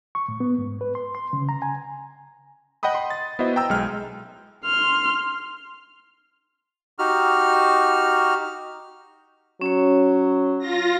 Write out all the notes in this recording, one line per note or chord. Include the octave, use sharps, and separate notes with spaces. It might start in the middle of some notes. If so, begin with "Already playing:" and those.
C#6
A2
B3
G#2
B4
C6
C6
C#3
A#5
G#5
D#5 F#5 G5 B5 D#6
C6
A6
B3 E4 F#4 C5 D#5
G5 A#5 E6
B1 G#3 F6
C6 F6
D#4 F#4 G4 F6
F#3 C#4 C#5
F4 A#6